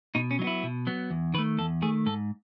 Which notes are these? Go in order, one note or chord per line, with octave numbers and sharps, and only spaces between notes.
B2 D#4
C#4
F#3 D#4
B3 E4
B2
F#3 B3
E2
D#3 A3 B4
E2 A4
D#3 A3 G#4
G#2 A4